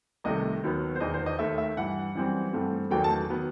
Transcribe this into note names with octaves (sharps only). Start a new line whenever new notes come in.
C2 C3 D#3 A3 D#5
D#2 D#3 F#3 B3
C5
E1 E2 D#3 D#5
C5
D#5
D#2 D#3 A3 E5
E5
G2 E3 G3 F#5
F#2 E3 G3 C4
G2 E3 A3 C4
F#1 E2 D#3 F#3 A3 G5
A5
D#3 F#3 B3